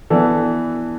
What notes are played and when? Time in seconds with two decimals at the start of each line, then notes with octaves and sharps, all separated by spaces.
0.10 E3 B3 D4 A4